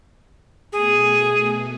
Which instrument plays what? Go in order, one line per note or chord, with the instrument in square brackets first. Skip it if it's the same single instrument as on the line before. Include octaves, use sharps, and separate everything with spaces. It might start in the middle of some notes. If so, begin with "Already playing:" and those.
[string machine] B2 A3 [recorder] G#4